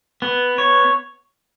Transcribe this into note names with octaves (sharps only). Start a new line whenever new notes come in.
B3
C#5